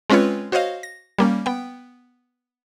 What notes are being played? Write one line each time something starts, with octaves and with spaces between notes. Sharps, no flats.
G#3 C4 C#4 F4 B4 C#5
F#4 C5 C#5 D#5 F5
A#6
G3 A#3 C#4
B3 G5